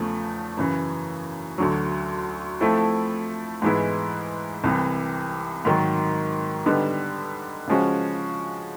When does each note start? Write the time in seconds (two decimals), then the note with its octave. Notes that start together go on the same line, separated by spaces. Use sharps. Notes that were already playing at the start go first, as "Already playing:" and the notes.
Already playing: E2 C#3 F3 A3
0.57 F#2 C#3 E3
1.58 D2 D3 F#3
2.60 F3 A3 C4 E4 A4
3.62 G#2 E3 G#3 B3 E4
4.64 C2 C3 E3
5.65 G#2 D#3 F#3
6.66 D3 G3 B3 D#4
7.67 C#3 F3 G#3 C#4 F#4